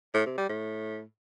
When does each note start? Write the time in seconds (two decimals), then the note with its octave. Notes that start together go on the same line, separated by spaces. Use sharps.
0.14 A2
0.26 C3
0.38 G3
0.49 A2